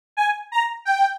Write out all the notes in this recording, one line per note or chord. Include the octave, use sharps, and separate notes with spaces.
G#5
A#5
G5